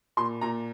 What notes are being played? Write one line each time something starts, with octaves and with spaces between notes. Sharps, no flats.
A#2 C6
A#2 A#5